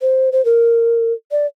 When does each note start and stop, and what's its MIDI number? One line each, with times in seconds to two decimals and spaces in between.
0.01 0.29 72
0.32 0.44 72
0.45 1.13 70
1.31 1.46 74